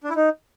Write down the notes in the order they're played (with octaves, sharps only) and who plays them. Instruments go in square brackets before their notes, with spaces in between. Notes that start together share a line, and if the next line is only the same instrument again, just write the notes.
[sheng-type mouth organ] D4
E4
D#4